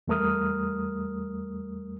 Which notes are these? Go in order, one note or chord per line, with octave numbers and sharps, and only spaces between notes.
E2 G3 A3 A#4 D#6 F6